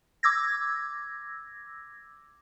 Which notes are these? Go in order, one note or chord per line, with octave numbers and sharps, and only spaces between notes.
D6 E6 G#6 A#6